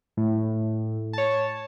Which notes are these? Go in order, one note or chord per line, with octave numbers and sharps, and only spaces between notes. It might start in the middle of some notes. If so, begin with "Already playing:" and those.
A2
C#5 A5